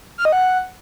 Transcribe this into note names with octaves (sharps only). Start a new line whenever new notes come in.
F6
D#5
F#5